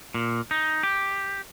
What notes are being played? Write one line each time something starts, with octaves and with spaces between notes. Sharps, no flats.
A#2
D#4
G4